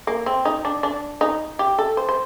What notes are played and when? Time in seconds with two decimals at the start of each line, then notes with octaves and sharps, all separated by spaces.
0.07 A#3
0.26 C4
0.45 D#4
0.65 D4
0.83 D4
1.21 D#4
1.59 G4
1.79 A4
1.97 C5
2.09 C5